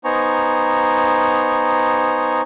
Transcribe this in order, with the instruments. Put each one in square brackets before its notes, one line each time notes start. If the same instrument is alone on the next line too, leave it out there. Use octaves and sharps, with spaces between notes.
[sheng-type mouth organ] B3 D#4 C5 G#5 A#5 C#6